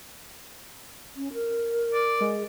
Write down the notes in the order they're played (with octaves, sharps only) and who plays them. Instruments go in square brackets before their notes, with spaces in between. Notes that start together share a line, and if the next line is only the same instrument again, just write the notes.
[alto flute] C#4
A#4
[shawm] D5
[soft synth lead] G#3